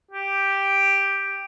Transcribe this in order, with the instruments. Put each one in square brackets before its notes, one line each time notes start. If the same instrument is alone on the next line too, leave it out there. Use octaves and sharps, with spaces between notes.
[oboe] G4